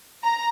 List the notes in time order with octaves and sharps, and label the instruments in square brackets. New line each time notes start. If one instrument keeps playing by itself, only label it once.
[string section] A#5